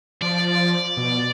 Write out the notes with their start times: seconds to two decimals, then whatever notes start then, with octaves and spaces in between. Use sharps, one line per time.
0.22 F3 D5
0.97 B2